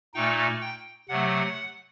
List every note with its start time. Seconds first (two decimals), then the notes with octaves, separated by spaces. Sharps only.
0.14 A#2 A3 D#4 G5
0.61 G5
1.09 C3 F#3 A3 F#5